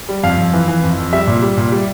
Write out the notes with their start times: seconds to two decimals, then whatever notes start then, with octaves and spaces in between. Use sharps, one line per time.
0.09 G3
0.23 F2 F5
0.38 F2
0.53 E3
0.68 E3
0.83 F2
0.98 F2
1.13 G3 E5
1.27 A#2
1.42 G3
1.57 A#2
1.72 G3